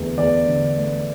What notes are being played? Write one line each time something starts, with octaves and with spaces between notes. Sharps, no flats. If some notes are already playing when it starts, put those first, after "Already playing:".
Already playing: E2 D3 A3
E2 D5
D3
A3